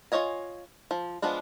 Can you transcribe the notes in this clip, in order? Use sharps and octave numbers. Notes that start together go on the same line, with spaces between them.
F4 G#4 C#5 D#5 G#5
F3
F3 G#3 B3 D4 F4